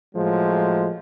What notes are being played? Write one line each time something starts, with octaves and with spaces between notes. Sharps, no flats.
A2 F3 F#3 G#3